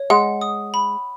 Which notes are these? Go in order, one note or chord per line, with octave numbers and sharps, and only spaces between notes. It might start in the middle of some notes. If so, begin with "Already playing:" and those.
Already playing: C#5
G#3 F#5
D#6
B5